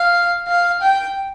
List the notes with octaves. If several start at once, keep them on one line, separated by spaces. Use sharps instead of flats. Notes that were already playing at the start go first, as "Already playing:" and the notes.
Already playing: F5
F5
G5